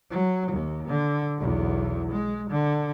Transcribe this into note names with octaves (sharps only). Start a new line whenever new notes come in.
F#3
D#2
D3
B1 E2
G#3
D3